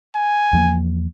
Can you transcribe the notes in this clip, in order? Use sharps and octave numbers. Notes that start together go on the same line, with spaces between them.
G#5
E2 F3 A#3